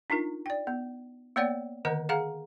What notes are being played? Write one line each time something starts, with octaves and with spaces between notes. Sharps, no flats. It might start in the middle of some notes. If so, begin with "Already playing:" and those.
D4 D#4 F4 A#4
D5 G5
B3
A#3 B3 C#5 D5 F#5 G5
D3 D#3 A#4 C5 D#5 F#5
G#4 F5 F#5 A#5